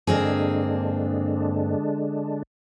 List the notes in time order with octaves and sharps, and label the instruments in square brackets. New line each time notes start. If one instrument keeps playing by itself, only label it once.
[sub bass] G2 [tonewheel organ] D3 G#3 D4 [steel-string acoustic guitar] A#3 C4 G#4